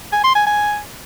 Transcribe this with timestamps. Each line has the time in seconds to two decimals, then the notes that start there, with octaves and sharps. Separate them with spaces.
0.12 G#5
0.24 C6
0.35 G#5
0.47 G#5